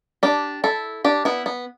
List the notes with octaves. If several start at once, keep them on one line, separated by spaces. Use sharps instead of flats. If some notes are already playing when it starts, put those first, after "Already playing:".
D4 G4
E4 A4
D4 G4
B3 E4
B3